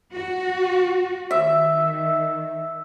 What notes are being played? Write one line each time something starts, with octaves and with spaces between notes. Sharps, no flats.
F#4
D#3 E5